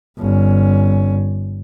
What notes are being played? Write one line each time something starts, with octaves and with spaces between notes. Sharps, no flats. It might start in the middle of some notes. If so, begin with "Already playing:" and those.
G1 C#4